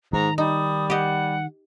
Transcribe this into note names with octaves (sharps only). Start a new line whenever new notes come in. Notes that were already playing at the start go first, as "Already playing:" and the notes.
G#2 D#3 A#5
G3 D#4 D#6
G4 D#5 F#5